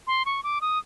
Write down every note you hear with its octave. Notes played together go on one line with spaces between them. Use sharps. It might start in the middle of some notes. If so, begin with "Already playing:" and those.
C6
C#6
D6
D#6